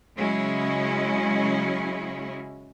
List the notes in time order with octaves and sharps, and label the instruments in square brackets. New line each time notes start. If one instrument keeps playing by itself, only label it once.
[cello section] C#3 F#3 G#3 C#4 E4